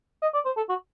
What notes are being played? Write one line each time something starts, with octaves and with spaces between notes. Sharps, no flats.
D#5
D5
C5
A4
F#4